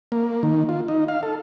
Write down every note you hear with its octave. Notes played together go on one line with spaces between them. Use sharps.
A#3
D#3
F4
D#4
F5
A4